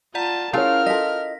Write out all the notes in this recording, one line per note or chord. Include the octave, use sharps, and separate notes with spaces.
F4 D5 F#5 A5 A#5
C#4 E4 F4 G#4 A#4 C#5 F6
A4 D#5 A#6 B6